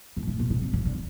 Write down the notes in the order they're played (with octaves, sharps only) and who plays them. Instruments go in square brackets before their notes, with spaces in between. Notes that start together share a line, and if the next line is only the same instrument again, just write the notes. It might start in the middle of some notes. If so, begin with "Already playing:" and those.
[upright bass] A2
A2
A#2
B2
C3
C#3
D3